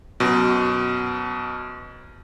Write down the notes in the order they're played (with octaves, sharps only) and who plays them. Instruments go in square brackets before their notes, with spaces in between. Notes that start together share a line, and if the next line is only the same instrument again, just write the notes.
[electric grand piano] F#2 B2